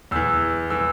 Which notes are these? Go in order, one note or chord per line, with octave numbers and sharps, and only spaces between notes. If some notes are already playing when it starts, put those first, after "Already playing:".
E2 E3 E6
E3 E6